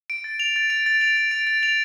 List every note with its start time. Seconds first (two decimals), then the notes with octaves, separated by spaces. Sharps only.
0.10 D7
0.24 A6
0.40 F7
0.56 A6
0.70 D7
0.86 A6
1.01 F7
1.17 A6
1.31 D7
1.47 A6
1.63 F7